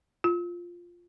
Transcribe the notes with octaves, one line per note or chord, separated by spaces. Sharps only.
F4